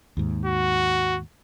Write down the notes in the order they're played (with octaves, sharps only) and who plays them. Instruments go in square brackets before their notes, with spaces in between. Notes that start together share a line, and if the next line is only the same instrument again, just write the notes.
[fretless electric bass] D#2 G#2
[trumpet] F#4